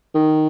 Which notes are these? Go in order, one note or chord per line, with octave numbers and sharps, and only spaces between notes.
D#3